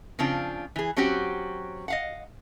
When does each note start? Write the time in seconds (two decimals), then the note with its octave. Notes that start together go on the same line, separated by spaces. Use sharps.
0.19 C#3 F3 C4 D4 F4
0.76 E3 G#4
0.97 F#3 C4 C#4 F#4 G4
1.88 D#5 F5 F#5